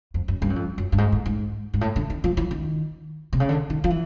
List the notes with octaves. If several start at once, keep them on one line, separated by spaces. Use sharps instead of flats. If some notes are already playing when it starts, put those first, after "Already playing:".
F2
F#2
G2
F#2
F2
F#2
G2
G#2
A2
G#2
G#2
A2
D3
D#3
F3
E3
D#3
C3
C#3
D3
D#3
F3
E3